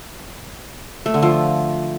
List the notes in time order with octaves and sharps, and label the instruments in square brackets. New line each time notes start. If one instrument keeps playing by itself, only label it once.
[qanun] A3
D3
F3